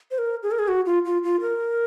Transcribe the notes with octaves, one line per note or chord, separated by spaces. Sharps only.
C5
A#4
G#4
A#4
G#4
F#4
F4
F4
F4
A#4